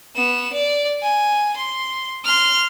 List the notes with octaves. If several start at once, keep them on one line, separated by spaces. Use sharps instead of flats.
B3 E7
D5
G#5
C6
C6 F6